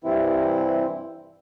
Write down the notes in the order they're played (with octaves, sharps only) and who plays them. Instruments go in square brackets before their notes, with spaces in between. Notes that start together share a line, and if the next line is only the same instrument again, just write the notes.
[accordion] G2 C3 E3 C4 E4